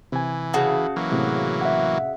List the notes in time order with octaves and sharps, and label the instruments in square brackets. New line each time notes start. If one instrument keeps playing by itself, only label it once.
[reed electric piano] C3 G#5 [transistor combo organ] E3
[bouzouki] C#3 F#4 A5
[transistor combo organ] E3 F#3 A#3
[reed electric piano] A2 C3
[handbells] E5 F#5